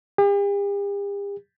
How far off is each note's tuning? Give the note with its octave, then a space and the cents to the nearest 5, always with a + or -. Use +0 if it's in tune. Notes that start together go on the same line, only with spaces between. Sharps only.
G4 +45